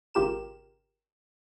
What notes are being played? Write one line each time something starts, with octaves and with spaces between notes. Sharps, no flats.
G#1 C#3 F4 G4 A#4 E7